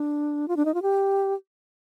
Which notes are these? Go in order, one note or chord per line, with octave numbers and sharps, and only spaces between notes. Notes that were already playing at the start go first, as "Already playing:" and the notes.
Already playing: D4
F4
D4
D#4
F4
G4